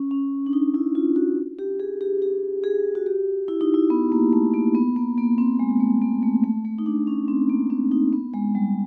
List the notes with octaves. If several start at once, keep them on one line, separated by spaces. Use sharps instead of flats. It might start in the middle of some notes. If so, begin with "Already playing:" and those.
Already playing: C#4
C#4
D4
D#4
E4
F4
F#4
G4
G#4
G4
G4
G#4
F#4
G4
E4
D#4
E4
B3
A#3
A3
A#3
B3
A#3
A#3
C4
G#3
A3
A#3
A3
A3
A3
D#4
D4
C#4
C4
A#3
C4
D#4
B3
G#3
G3